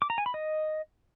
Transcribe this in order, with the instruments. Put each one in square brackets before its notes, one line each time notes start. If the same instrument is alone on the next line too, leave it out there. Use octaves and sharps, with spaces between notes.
[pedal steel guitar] D6
A#5
G#5
B5
D#5